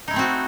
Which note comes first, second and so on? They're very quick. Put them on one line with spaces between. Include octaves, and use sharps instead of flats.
D#4 E4 A3 C4 F#4